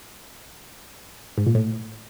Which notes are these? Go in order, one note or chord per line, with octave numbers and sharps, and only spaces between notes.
G#2
A#2
A2